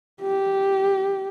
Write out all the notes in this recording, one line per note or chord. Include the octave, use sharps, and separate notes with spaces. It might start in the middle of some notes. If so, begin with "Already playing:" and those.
G4